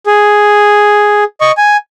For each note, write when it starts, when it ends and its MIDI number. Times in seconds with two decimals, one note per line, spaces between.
0.06 1.24 68
1.41 1.52 75
1.41 1.52 85
1.57 1.77 80